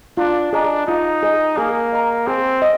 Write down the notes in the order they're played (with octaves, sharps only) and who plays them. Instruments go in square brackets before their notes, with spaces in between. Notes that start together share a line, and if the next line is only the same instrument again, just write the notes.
[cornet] D4 [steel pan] F4
[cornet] D4 [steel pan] G#4 D#5 A#5
[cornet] D#4 [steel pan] F4
[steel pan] G#4 D#5 A#5
[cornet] A#3 [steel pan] G#4
[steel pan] D#5 A#5
[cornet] C4 [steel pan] G#4
[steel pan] D#5